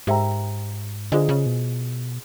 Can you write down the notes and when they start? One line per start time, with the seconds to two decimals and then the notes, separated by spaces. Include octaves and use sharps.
0.07 G#2 G4 C5 E5 G5 A#5
1.12 D3 F4 G#4 C5 D#5 G#5
1.29 C#3
1.46 B2